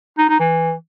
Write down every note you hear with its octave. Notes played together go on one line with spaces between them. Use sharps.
D#4
D#4
E3